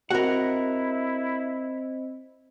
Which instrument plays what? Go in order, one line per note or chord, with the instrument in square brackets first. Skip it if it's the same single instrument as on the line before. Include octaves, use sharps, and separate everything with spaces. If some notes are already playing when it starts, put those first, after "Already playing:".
[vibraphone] C4 C5 D#5 [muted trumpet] E4 [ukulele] F#4 [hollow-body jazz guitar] A#4 F#5